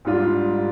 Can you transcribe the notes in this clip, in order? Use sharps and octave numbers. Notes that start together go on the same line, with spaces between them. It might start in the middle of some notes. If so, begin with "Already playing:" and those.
G#2 G3 D4 F4